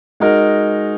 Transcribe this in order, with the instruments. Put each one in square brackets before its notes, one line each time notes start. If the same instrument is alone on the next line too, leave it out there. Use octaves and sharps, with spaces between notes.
[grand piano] G#3 D#4 F#4 A#4